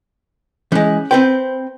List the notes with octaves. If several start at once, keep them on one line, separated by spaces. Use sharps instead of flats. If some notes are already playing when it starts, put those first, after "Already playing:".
E3 G#3 C#4 F#6
C4 B4 C5 G5 C6